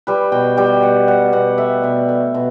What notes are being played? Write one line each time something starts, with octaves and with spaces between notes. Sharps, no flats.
G3 B4
B2 G5
G3 G5
B2 F#5
G3 F#5
B2 F#5
A3 E5
B2
A3
B2